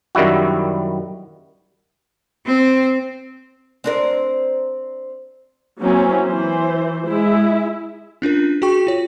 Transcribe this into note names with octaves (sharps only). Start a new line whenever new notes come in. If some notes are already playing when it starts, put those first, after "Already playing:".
F#2 D#3 G3 E4 F#4
C4
C4 D4 A#4
F#3 A#3 C4 C#4 E4
E3 C5
G#3 E4 E5
C#4 D4 F4 A#4
F#4 G#4 G5 C#6
F4 C#5